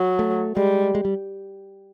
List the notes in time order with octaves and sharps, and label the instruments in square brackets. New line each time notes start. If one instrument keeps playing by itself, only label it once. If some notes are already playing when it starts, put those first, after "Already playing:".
Already playing: [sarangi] F#3
[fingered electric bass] A3
[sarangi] G3 [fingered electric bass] G#3
[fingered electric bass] G#3
G3